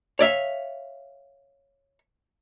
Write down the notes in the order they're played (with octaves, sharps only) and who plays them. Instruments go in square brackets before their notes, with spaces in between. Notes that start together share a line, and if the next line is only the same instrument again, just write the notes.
[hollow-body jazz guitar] C#5 D5 E5 F5